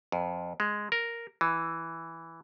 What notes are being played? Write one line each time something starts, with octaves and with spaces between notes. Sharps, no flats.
F2
G#3
A#4
E3